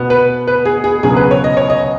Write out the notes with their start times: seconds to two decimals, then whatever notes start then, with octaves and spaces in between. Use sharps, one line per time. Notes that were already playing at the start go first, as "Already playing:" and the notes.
Already playing: B2 B3
0.10 B4
0.47 B4
0.65 G#4
0.84 G#4
1.03 C#2 B2 F#3 C#4 G#4
1.16 B4
1.31 C#5
1.44 D#5
1.57 C#5
1.70 D#5